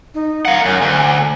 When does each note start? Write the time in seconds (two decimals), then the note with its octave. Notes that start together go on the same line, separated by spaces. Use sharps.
0.14 D#4
0.45 A#4 F5 F#5
0.66 F#2 G#5
0.82 D2